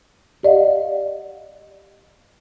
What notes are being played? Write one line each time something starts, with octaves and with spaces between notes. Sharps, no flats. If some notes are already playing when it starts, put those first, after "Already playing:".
G4 D5 D#5 F5 F#5